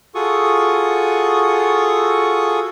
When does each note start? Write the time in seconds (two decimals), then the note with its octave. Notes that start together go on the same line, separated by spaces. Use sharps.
0.15 F4 F#4 G#4 A4 C#6 D#6